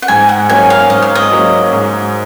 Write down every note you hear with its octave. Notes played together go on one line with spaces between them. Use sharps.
F#5
G#2 G#5
F#5
F#3 A#3 C#4 G#5
F5
G#2 D#5
F5
D#5
F#3 A#3 C#4
G#2